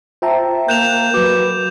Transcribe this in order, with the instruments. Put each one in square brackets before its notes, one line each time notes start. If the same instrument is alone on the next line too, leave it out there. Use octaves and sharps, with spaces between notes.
[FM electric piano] F4 E5 A5 [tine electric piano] C5 G5 A#5
[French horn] A#3 [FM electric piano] F#6 [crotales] G6 E7 F7
[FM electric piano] F#3 F#4 [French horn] B4 [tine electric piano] D6